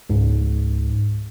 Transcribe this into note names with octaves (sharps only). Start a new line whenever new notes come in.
C#2 G#2